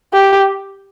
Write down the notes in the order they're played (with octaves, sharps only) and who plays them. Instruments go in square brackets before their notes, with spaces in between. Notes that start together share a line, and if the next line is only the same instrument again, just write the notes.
[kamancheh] G4